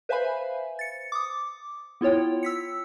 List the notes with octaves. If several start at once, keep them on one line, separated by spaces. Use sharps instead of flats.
B4 C5 E5 F5 G#5 B5
A6 C#7
D6 D#6
B3 E4 F4 C#5 G5
E6 B6 C#7